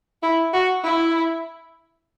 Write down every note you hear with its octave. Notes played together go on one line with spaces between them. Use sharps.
E4
F#4
E4